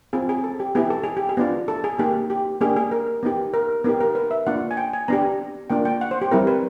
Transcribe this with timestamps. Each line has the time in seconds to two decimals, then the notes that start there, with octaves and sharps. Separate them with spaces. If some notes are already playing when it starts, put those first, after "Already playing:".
0.13 C4 F4 G#4
0.29 G#4
0.44 A4
0.60 G4
0.75 B3 E4 G4 G#4
0.90 A4
1.04 G#4
1.17 G4
1.29 G#4
1.37 B3 D4 F4
1.68 A4
1.84 G#4
1.98 A#3 D#4 G4 G#4
2.30 G4
2.61 A#3 D4 G4 G#4
2.76 G#4
2.91 A#4
3.23 B3 D#4 G4
3.54 A#4
3.84 B3 D#4 G4 A#4
4.01 A#4
4.15 B4
4.31 E5
4.47 A#3 D4 F4 F#5
4.71 G#5
4.77 G5
4.93 G#5
5.08 B3 D4 G4 A#5
5.70 A#3 D4 F4 G5
5.85 G5
6.01 F#5
6.11 C5
6.22 G4
6.32 G3 C4 E4 A#4
6.47 B4